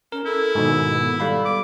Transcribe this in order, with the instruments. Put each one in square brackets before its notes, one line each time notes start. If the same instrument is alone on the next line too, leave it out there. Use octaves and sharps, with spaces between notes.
[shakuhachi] C#4 [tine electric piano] A#4
[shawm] E4 [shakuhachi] A4
[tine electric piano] G#2 B2 D#3
[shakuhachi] B3
[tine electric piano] G3 F5 B5 [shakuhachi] A4
[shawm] D6